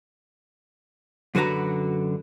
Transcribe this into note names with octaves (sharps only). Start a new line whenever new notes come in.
F#2 D3 F#4 B4 A#5